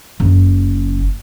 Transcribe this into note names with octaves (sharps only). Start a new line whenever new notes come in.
F#1